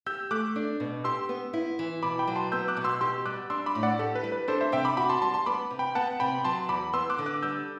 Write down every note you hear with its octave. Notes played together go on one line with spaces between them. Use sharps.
G4 E6 G6
A3 D6 F#6
D4
B2
G4 C6 E6
B3
E4
E3
B2 B5 D6
G5 B5
F#3
A5 C6
B3 E6 G6
D6 F#6
B2
C6 E6
G4 C6 E6
G3 D6 F#6
D4 C6 E6
B5 D6
A2
D5 F#5
G4 A4
B4
G3
B4
D4 A4 C5
C5 E5
C3 E5 G5
B5 D6
F#4 B5 D6
A5 C6
G3 A5 C6
A5 C6
B3 B5 D6
C3
G5 B5
B3 F#5 A5
C3 G5 B5
F#3 A5 C6
E2 B5 D6
B3 C6 E6
D6 F#6
D3
D6 F#6
G3 E6 G6